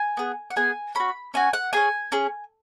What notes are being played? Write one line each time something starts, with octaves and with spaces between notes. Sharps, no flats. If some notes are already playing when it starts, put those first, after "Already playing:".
Already playing: G#5
B3 G#4
F#5
B3 G#4 G#5
C#4 F#4 B5
C#4 F#4 G#5
F#5
C#4 G#4 G#5
C#4 G#4